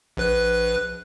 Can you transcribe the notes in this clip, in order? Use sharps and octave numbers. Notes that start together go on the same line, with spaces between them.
A#1 B4 F#6